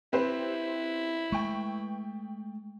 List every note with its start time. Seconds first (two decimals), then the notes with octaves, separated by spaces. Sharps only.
0.13 C4 E4 G4 B4 C5
1.32 G#3 A3 G5 C#6